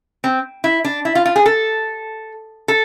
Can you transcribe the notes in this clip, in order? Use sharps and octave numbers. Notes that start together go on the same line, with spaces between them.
C4
E4
D4
E4
F4
F4
G#4
A4
A4